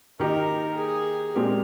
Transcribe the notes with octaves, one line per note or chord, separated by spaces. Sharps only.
D#3 A#3 D#4 G4 A#4
G#4
A#2 G#3 C4 G4 A#4